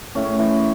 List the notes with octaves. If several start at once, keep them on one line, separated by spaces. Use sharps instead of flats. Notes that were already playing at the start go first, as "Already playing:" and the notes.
A2 C#4
E3